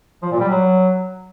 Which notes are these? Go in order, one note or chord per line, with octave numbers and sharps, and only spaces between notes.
F3
A#2
G3
F#3